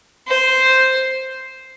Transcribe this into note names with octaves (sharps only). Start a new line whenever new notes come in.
C5